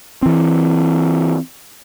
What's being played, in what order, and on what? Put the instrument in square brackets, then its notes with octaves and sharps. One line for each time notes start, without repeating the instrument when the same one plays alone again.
[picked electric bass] E3 C4